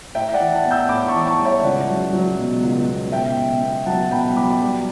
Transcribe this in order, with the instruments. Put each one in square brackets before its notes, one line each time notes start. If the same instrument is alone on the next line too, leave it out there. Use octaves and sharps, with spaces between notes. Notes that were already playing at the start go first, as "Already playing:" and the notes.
[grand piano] A2 E5 G5
D5 F#5
E3
F#5 A5
B3
E6 G6
A2 B5 D6
A5 C#6
E3
A5 C#6
G3
C#5 E5
C#2 D5 F#5
F#3
F#3
B2
C#2
B2
B2 E5 G5
B2
B3
F#3 F#5 A5
B2 G5 B5
F#3 B5 D6
G3